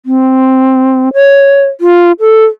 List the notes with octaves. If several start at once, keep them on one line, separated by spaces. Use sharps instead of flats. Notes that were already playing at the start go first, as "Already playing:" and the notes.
C4
C#5
F4
A4